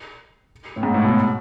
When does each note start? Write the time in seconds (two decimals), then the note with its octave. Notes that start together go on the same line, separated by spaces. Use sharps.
0.76 A2
0.83 G#2
0.94 A2
1.04 B2